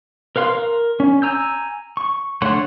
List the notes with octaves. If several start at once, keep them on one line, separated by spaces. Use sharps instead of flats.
A#4 B4 F5 C6
A#4
C#4
G#5 A#5 E6 G6
C#6
D3 A3 C#5 F#5 C6